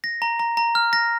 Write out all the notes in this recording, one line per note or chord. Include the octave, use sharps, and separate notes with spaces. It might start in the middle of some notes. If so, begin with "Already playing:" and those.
A#6
A#5
A#5
A#5
F6
A#6